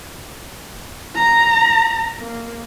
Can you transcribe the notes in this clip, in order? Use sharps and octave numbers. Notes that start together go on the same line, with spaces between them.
A#5
A#3